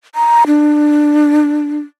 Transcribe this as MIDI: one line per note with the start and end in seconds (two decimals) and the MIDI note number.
0.15 0.43 82
0.47 1.79 62